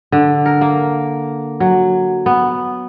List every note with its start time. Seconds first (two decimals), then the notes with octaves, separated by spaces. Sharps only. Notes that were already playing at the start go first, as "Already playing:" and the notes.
0.12 D3
0.46 A#4
0.61 A#3
1.60 F#3
2.26 B3